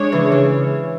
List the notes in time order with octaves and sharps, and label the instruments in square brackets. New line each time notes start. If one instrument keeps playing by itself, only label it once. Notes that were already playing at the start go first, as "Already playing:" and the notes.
Already playing: [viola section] G#3 D4 G#4 C#5
[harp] C#3 E3
C#3